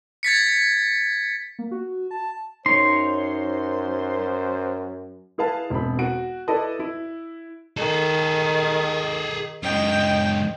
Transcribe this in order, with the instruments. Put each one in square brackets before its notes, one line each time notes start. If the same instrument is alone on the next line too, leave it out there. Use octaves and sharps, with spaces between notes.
[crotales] G#6 A6 B6 C#7
[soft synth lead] A#3
F#4
A5
[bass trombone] F#2 [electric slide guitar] D#4 C#5 [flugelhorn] C5 [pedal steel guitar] C6
[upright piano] E4 G#4 B4 F5 A5
E1 C4 B5
F#4 D7
E4 A4 B4 D5 D#5 A5
E4
[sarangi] D#3 [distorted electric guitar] G#4 A4
[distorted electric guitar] F#2 G#3 [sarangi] D#5 [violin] G5